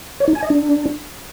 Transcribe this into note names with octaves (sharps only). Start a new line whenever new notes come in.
C#5
D#4
G#5
D#5
D4